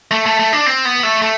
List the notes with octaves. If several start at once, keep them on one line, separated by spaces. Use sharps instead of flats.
A3
A3
A3
D4
C4
B3
A3
A3